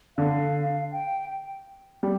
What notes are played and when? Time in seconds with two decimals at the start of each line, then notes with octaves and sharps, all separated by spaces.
0.18 D3 F5
0.92 G5
2.03 G3